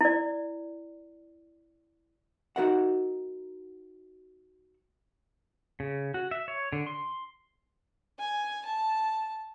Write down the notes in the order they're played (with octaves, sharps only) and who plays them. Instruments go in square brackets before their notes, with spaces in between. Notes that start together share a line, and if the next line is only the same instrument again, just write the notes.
[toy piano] E4 D5
[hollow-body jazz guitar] D#4 E4 F#4 A#4 E5 F#5
[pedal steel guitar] C#3
F#4
E5
C#5
D3
C6
[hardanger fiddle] G#5
A5